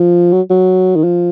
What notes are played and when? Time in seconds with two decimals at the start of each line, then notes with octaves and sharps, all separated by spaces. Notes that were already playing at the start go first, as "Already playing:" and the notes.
Already playing: F3
0.32 F#3
0.50 F#3
0.96 D#3
1.04 F3